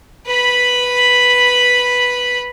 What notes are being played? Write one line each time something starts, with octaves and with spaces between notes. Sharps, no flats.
B4 B5